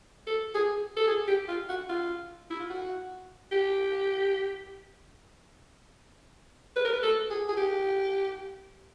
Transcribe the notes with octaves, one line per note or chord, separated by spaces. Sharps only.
A4
G#4
A4
G#4
G4
F4
F#4
F4
E4
F4
F#4
G4
B4
A#4
B4
A4
G#4
G#4
G4